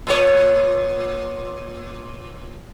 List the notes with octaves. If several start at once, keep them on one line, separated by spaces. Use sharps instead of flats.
A#2 B3 C#5